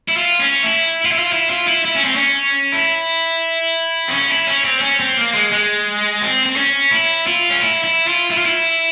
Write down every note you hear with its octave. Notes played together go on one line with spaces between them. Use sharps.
E4
F4
C#4
E4
F4
E4
F4
E4
F4
E4
E4
C#4
C4
C#4
E4
C4
C#4
E4
C#4
C4
C#4
C4
A#3
G#3
G#3
C4
C4
C#4
E4
F4
C#4
E4
E4
F4
E4
F4
E4